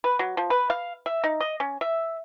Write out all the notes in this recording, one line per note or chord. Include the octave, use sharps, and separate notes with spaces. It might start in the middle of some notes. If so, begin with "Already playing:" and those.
B4
F#3
F3
B4
F5
E5
D#4
D#5
C#4
E5